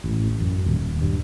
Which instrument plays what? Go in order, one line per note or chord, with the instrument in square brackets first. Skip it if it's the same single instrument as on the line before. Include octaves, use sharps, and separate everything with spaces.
[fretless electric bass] A1
F#2
D#1
G2